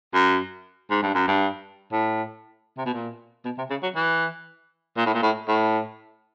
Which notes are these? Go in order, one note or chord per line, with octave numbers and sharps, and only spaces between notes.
F#2
G#2
G2
F#2
G2
A2
C3
B2
A#2
B2
C3
C#3
F#3
E3
A#2
A2
A#2
A2
A2